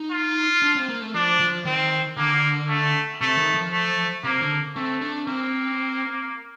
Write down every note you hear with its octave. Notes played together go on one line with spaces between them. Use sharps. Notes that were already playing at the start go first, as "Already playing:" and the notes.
Already playing: D#4
F4
D4
C4
A#3
A3
F3 D4
F3
D#3 C4
D3 A#3
A3
C3 A3
D#3
F3
A3
C3 A#3
D3
A3 C4
D4
A#3 C4